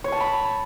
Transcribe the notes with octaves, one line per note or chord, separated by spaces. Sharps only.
C#5
A5
B5